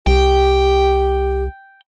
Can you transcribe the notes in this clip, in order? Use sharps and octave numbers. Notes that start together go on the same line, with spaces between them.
C2 G4 G5